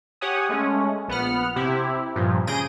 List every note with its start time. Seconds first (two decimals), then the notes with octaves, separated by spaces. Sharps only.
0.21 G4 C#5 F#5 G#5 D#6
0.49 G#3 A3 C#4
1.08 A#1 B3 B4 F#5 F6
1.56 C3 E4 G4
2.16 G2 A#2 F3
2.47 C#3 G#4 G6 A#6 D7 D#7